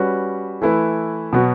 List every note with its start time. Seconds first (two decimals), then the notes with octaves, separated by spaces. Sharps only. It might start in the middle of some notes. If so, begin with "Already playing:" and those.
Already playing: G3 C#4 F#4 B4
0.62 E3 A3 E4 B4
1.33 B2 F#3 B3 F#4